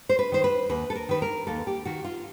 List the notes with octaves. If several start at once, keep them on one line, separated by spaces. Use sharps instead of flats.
C5
B4
D#3 C5
B4
D#2 B4
A4
A#4
D#3 B4
A#4
D#2 A4
G4
D#3 F#4
F4